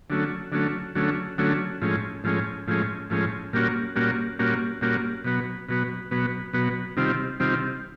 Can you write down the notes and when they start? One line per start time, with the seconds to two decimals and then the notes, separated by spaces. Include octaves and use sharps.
0.10 D3 F#3 A3 C#4
0.52 D3 F#3 A3 C#4
0.95 D3 F#3 A3 C#4
1.38 D3 F#3 A3 C#4
1.81 A2 F3 G#3 C#4
2.24 A2 F3 G#3 C#4
2.67 A2 F3 G#3 C#4
3.10 A2 F3 G#3 C#4
3.53 A#2 G3 A#3 C#4 F#4
3.96 A#2 G3 A#3 C#4 F#4
4.39 A#2 G3 A#3 C#4 F#4
4.81 A#2 G3 A#3 C#4 F#4
5.24 B2 F#3 B3
5.68 B2 F#3 B3
6.11 B2 F#3 B3
6.53 B2 F#3 B3
6.97 C3 D#3 G3 C4 F4
7.40 C3 D#3 G3 C4 F4